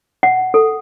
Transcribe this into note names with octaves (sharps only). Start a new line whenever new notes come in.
F#5
A4